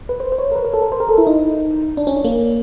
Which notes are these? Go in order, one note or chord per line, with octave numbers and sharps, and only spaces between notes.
B4
C5
C5
C#5
A#4
B4
A#4
A4
A#4
C5
A#4
A4
E4
D#4
D4
C#4
D4
A#3